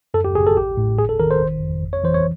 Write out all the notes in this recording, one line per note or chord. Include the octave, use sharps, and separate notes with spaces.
F#2 A4
G4
G1 G#4
A4
A1 G4
A2
G1 G#4
A4
D#3 A#4
C5
G1
F2
G#1
C#5
E3 C5
C#5